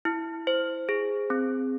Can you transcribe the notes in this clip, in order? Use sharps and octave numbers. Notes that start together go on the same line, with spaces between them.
E4
C5
G#4
C4